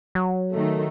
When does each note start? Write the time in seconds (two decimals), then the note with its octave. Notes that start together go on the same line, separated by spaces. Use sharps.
0.15 F#3
0.52 D#3 A3